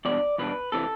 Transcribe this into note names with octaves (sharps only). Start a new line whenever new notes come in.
E2 B2 G3 D4 D5
E2 B2 G3 D4 B4
C3 E3 A4